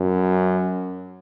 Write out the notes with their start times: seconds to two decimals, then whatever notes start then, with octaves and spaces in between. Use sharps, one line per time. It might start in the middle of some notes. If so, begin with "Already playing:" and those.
Already playing: F#2